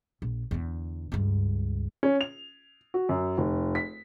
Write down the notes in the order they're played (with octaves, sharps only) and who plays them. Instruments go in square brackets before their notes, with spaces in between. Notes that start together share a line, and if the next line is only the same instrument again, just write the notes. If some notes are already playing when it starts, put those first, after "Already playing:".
[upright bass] A#1
E2 D3
C#2 G2
[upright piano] C#4
F7
F#4
F#2
F1
B6